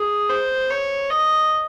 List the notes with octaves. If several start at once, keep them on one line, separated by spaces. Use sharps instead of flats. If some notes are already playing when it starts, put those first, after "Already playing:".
Already playing: G#4
C5
C#5
D#5